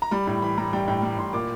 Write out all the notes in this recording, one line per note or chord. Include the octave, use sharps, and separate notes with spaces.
A#5
G3 B5
A2
E3 B5
G3 A#5
G3 G5
A2 G5
G3
A2 C6
A#2 D6